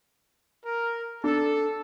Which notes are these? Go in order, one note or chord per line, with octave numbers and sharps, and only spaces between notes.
A#4
D4 A4